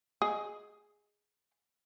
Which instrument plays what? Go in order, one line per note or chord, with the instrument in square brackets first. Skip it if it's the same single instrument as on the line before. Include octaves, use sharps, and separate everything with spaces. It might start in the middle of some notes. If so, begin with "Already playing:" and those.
[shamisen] G#4 D#5